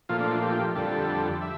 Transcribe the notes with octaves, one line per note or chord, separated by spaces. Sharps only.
A#2 F3 A3 F4
D4
D4
G4
F2 D3 G3 A4
E5